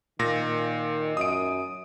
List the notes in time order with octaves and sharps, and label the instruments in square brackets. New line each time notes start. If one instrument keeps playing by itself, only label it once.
[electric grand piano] A#2 A#6 [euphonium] D#3
[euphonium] F#2 [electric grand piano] D#6 D7